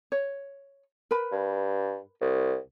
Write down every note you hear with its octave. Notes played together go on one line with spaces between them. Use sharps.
C#5
A#4 B4 B5
G2
C2